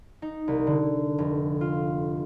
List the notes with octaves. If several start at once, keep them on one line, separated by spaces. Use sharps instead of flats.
D#4
C2
D3
F1
F4